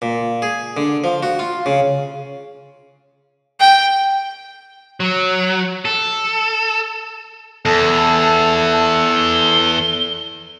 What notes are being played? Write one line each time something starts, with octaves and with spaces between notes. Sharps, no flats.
A#2
G#4
D3
F3
F#4
F4
C#3
G5
F#3
A4
E2 A4 A5
G7